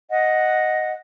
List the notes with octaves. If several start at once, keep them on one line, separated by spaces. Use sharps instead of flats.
D#5 F#5